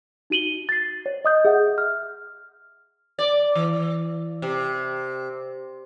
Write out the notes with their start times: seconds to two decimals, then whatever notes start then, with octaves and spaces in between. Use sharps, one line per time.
0.30 D#4 F#4 D#7 F#7 G7
0.69 A6 C7
1.06 C#5
1.25 D#5 D#6 G6
1.45 G#4 E5 F#5
1.78 F6
3.19 D5
3.55 E3
4.42 C3